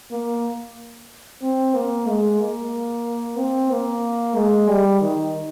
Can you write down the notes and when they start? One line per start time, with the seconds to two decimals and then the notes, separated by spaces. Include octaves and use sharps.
0.11 A#3
1.42 C4
1.75 A#3
2.08 G#3
2.39 A#3
3.38 C4
3.70 A#3
4.36 G#3
4.68 G3
5.01 D#3